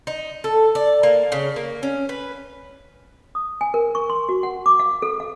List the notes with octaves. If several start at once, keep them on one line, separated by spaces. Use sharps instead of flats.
D#4
A4
D5
A#3
C#3
A#3
C#4
B4
D#6
G#5
A#4
C#6
C6
F#4
F#5
D6
F5
A4
F5